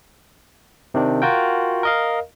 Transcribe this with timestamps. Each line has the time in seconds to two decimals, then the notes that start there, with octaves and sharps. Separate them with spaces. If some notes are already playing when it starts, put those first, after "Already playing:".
0.94 C3 D#3 D4
1.22 F4 F#4 A#4 G5
1.83 A#4 D#5 F5